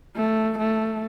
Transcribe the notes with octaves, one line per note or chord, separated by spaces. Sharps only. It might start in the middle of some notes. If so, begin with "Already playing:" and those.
A3
A3